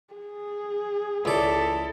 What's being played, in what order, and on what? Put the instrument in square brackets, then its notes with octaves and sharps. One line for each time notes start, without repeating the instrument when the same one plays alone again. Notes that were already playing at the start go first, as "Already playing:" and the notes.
[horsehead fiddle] G#4
[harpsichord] C#2 D5 [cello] E4 A4